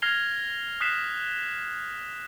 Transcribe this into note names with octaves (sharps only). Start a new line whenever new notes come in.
F6 G#6 A#6 C7 F7 G7
D#6 F#6 B6 C7 E7